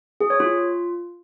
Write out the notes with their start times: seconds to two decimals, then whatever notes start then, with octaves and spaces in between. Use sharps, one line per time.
0.20 G#4
0.30 C#5
0.40 F4